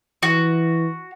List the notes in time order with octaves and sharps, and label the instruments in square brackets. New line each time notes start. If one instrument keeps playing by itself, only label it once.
[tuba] E3 [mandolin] F#4